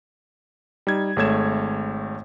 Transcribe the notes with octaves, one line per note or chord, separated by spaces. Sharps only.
G3 D#4 G#6
G#1 G#3 A3 C#5 G#6 E7